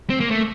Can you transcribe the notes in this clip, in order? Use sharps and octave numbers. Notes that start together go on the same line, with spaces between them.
C4
A#3
A3